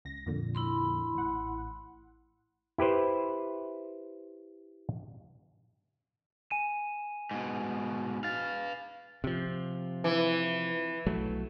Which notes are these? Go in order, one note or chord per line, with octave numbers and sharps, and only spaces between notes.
C#2 A#6
F2 A#2 D3
E4 B5 C6
A1 F#5
E4 G4 B4 C5
G#5 D#7 E7
G#2 B2
B4 F5 A6
C3 F3
E3
B1 F#3 A3